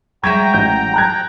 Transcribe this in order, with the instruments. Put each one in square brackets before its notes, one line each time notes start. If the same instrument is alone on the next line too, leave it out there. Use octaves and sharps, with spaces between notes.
[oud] F#3 G#3 E5 [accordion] G5 A#5 [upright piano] C#6 G6 G#6
[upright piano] A1 G6
A5 F#6 G#6